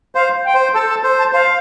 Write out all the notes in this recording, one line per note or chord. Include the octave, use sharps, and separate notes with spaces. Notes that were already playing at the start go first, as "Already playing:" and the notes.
C5 F5
G5
C5
A4 A5
A5
C5
A5
C5 F5